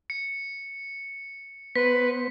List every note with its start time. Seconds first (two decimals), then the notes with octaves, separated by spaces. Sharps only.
0.10 C#7
1.75 B3 B4 C5 B6